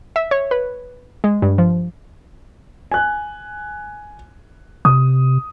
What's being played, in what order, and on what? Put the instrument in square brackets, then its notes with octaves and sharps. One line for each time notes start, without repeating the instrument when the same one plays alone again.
[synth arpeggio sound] E5
C#5
B4
G#3
G2
F3
[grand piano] G#5 F#6
[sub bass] C3 [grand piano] D#6